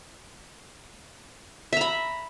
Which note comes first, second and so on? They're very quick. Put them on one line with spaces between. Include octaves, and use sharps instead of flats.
E5 A#5 B5